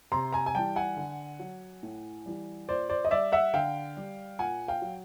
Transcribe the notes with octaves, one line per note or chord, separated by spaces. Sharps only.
C3 A#5 C6
G#5 A#5
G#5
E3 G3 G5 A5
F#5 G#5
D3
F#3
A2
E3 G3
A#2 C5 D5
C5 D5
D#5
G3 D5 E5
E5 F#5
D3 F5 G5
G3
A#2 F#5 G#5
F5 G5
F#3